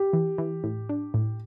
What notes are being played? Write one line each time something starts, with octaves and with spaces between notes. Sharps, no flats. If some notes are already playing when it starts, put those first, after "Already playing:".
Already playing: G4
E3
E3
A2
D4
A2